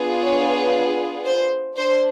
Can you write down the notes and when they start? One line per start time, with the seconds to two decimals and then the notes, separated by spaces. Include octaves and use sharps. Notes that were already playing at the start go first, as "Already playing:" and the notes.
Already playing: B3 D4 F4 G#4
0.22 C#5
1.25 C5
1.77 D4 C5